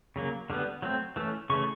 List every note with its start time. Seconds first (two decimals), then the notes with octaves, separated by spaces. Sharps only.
0.16 C#3 F#3 A#3
0.50 D3 G3 B3
0.82 F#3 A3 C4
1.16 E3 A3 C#4
1.50 C#3 E3 A3 C#6